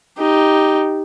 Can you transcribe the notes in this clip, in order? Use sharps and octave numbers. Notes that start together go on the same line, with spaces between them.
D#4 G4